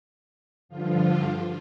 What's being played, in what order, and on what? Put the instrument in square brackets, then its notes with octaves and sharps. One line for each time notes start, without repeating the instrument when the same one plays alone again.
[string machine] G2 D3 F3 F4